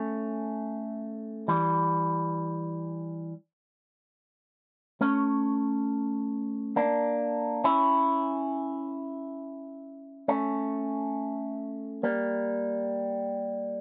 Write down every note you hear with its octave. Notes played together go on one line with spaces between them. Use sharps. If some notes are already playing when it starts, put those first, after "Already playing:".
Already playing: A3 C#4
E3 G3
A3 C#4
A#3 D4
C#4 E4
A3 C#4
G3 A#3